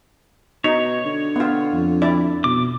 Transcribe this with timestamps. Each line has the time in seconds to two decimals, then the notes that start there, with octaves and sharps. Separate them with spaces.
0.64 B2 D#4 C#5
1.05 D3
1.36 B3 F4
1.73 F2
2.02 E4 D5
2.44 B2 D6